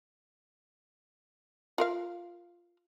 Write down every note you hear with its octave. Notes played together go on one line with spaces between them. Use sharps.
F4 A#4 F5